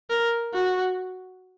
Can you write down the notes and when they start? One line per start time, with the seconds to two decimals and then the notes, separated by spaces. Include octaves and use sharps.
0.10 A#4
0.54 F#4